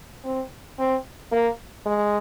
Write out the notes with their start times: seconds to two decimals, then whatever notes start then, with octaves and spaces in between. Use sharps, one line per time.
0.24 C4
0.79 C4
1.32 A#3
1.86 G#3